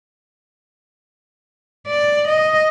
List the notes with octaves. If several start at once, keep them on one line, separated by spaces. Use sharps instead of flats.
D5
D#5